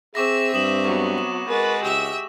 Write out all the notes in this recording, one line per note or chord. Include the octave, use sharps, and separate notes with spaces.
C4 G#4 E5 C#6 D6 E6 A#6
G2 D#6 E7 F#7
F#3 B3 C#6
E7
G#3 F#4 A#4 B4 A6
C#2 G4 E5 E6